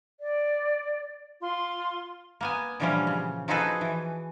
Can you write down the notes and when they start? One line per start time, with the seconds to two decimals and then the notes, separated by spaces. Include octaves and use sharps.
0.20 D5
1.39 F4 C6
2.41 A#3 B3 G#5
2.80 A#2 D3 E3 F3 G3 C#4
3.07 C#3
3.48 F3 D#4 F#4 G#4 A4 B4
3.81 E3